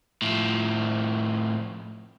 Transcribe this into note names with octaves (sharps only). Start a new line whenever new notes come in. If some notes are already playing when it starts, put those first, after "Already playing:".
A2 F3